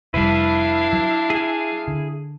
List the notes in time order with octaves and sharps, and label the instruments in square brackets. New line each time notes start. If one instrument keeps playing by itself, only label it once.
[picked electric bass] F1 G3 [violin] D4 F5 [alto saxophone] E4 [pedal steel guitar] B4
[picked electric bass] F#3
[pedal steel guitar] G#4 G#5
[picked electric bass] D3